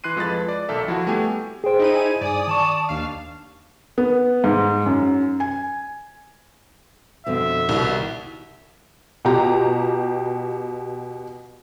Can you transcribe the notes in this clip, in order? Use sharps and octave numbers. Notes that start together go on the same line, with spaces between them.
E3 C6 F#6 C7 D#7
F2 F3 G#3 B4 A6
D5
B1 D#3 A4 E5
F3 E4 F#4
G3 A3 B3 G4 G#5
G#4 C5 G5
D#4 E4 D#7
G#5
G2 D5 D#6
D#3 A5 C#6
D#2 D4 F5
B3
G#2
F#2
G#5
F2 B2 D3 E5
C2 B2 D#3
B2 F4 G4 A#5